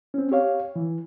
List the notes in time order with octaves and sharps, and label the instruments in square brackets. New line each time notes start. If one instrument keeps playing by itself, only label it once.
[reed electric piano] C4 C#4
G4 C#5 F5
E3